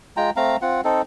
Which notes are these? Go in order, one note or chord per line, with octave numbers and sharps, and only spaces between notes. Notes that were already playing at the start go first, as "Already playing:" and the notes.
G#3 F4 G5 A#5
A3 C4 F5 A#5
C4 F4 F#5
C4 D#4 A4